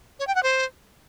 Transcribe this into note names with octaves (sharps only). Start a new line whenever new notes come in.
C#5
G5
F#5
C5